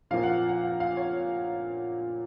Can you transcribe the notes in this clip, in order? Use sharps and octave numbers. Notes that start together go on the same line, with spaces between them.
A#2 F3 A#3 F5
F#5
F#5
F#5
F5
C#5